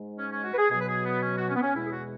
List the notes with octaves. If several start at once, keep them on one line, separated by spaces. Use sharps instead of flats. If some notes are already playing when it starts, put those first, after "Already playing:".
Already playing: G#2 G#3
C#4
C#4
F#4
B4
G#4
B2 F#3 G#4
B4
G#4
B3
C#4
F#4
C#4
B3
C#4
E2 B2 G#3 E4
G#4
F#4